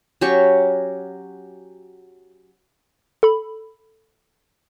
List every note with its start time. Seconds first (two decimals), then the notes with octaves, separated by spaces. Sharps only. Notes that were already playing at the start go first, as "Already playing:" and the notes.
0.21 F#3 C#4 G4 C#6
3.23 A4 B5